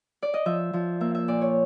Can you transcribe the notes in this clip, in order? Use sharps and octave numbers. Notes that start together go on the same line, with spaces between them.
D5
D#5
F3 E5
F3
A#3 E5
E5
A#2 D5
C#5